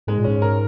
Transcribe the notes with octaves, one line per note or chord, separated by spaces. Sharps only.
G#2 G#3
A#2
G#2 C#4
A#4